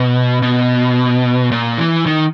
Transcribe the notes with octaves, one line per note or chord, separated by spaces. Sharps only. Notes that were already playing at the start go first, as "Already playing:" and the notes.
Already playing: B2
B2
A#2
E3
D#3